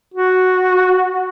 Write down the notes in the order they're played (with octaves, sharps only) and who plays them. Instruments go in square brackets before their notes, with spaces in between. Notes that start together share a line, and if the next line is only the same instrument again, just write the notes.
[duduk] F#4